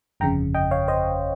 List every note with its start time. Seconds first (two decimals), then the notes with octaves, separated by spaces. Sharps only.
0.20 G1 F2 C#3 G5 A#5
0.54 D#5 G5
0.71 C#5 F5
0.88 C5 D#5